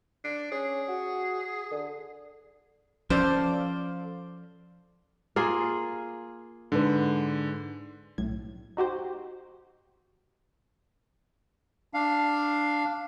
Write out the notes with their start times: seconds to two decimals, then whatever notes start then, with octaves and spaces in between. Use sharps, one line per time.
0.24 D4
0.52 C#4 G#4
0.88 F#4
1.71 D3
3.10 F3 C#4 A4 C5 D5 F5
5.36 A#3 F4 G#4
6.72 G#2 D3 B4
8.18 B1 A2 G#6
8.77 D#4 F#4 G4 C5
11.94 D4 F5